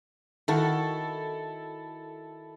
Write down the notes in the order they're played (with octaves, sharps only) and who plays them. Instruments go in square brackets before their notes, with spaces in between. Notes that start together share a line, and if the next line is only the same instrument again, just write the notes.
[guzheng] D#3 F#4 [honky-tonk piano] E4 A4